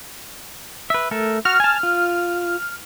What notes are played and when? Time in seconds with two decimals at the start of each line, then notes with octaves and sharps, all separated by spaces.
0.90 B4 E5
1.11 A3 A4 A#4
1.45 F#4 F6
1.60 G#5 A5
1.83 F4